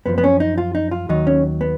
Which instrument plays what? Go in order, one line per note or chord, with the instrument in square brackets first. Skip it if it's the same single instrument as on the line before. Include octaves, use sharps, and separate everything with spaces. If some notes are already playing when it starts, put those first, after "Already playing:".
[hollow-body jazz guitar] F#2 F3 B3
B3
C#4
D#4
F4
D#4
F4
D#2 D#3 F#3 D#4
C#4
B3